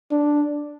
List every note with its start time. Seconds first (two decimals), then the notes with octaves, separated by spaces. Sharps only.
0.11 D4